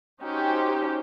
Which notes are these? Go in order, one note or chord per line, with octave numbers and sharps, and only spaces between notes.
C#4 D#4 F#4 G4 C5